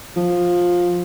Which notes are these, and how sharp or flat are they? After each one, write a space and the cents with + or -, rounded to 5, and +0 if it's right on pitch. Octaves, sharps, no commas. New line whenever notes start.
F3 +15